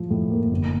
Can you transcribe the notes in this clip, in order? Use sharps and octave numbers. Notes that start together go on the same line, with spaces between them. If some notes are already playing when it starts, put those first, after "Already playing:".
Already playing: A2 F3
A2
A#3
G1